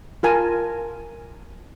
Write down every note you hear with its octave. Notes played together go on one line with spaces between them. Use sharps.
F4 A#4 G#5 A5